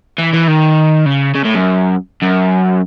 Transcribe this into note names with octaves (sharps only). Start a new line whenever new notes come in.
E3
E3
D#3
C#3
C#3
A2
F#2
F#2